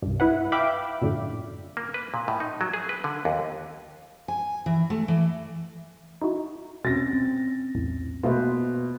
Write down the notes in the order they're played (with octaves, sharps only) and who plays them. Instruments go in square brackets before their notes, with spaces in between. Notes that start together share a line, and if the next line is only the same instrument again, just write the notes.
[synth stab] C2 G2
E4 B4 F#5
E5 F5 G5 B5 D6
F#2 A2 D3
[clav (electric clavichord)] A#3
B4
A#2
A2
D#4
F#3
G#4
B4
D3
D#2
[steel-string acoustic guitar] G#5
E3
A3
E3
[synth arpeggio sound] D#4 E4 F#4
[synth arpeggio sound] B2 [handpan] C4 C#4 [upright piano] A6 A#6
[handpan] C4
[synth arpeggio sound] B1 E2 A2
[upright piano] B2 [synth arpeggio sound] A3 A#3 F4 [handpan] B4 C5